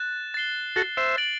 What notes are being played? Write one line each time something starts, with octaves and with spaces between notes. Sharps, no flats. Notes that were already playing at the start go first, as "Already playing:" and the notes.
Already playing: F#6 A6 E7
A6 C7 G7
F#4 A4
C5 E5
A6 D7 F#7